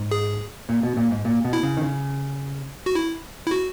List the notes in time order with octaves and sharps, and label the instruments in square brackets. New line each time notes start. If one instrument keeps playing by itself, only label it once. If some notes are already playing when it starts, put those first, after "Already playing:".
Already playing: [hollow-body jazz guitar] G#2
[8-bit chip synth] G#4
[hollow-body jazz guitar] A#2
B2
A#2
G#2
A#2
B2
[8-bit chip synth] E4
[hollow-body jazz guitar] C#3
D#3
C#3
[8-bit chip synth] F#4
E4
E4
F#4